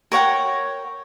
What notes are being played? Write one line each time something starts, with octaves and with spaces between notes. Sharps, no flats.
A#4 C#5 F#5 G5